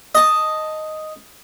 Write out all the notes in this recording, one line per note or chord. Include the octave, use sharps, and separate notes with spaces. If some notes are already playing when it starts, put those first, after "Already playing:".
D#5 A5